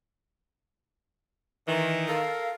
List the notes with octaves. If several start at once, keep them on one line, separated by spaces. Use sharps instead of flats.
D#3 E3
A4 A#4 F5